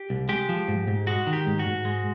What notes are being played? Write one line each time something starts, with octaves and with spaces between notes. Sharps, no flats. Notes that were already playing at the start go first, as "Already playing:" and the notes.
Already playing: G4
C2
G#3 G4
F3
G#2
G#2
G#3 F#4
D#3
G4
G#2
F#4
G#2
G#3